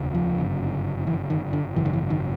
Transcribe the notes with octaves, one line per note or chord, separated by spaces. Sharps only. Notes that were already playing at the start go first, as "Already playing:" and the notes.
Already playing: F1 D#2 C#3
F3
G1 F#2 C#3
E3
D#3
D3
G#1 F#2 C#3 E3
D#3
E3
D#3